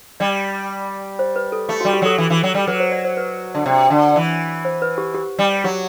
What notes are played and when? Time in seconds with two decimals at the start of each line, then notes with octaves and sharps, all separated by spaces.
0.20 G3 D5
1.19 C5
1.36 B4
1.52 A4
1.69 A3 G4
1.81 F#4
1.85 G3
1.93 G4
2.02 F#3 A4
2.18 E3
2.30 E3
2.43 F#3
2.54 G3
2.67 F#3 B4
2.80 C5
2.92 D5
3.05 C5
3.17 B4
3.55 D3
3.66 C3 D5
3.90 D3
4.16 E3
4.65 C5
4.82 B4
4.98 G4
5.14 G4
5.39 G3
5.64 F#3 G4